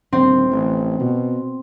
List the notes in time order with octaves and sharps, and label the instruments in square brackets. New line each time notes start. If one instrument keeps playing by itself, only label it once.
[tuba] D#1 [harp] C4
[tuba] A1
B2